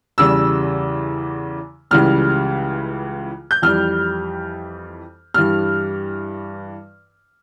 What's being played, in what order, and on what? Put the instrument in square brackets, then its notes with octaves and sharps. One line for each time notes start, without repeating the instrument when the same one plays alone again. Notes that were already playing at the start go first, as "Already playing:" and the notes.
[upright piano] E2 C#3 E3 G3 E6
C#2 C#3 E3 G3 F6
G6
F2 E3 G3 F6
G2 E3 G3 F6